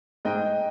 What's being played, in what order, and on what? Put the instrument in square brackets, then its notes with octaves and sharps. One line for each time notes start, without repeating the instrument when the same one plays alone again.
[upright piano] G#2 D#5 G5